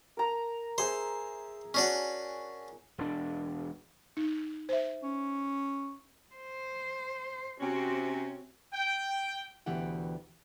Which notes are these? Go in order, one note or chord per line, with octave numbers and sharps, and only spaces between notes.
A#4 A#5
G#4 C5 E5
C#4 D4 F#4
E1 D4
D#4
C5 E5
C#4
C5
C3 C4 C#4 F#4
G5
D2 B2 E3 G4 F#5 G5